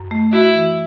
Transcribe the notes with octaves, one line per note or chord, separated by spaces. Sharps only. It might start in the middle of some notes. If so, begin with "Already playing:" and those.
Already playing: F#2
A3
E4 F#4
E3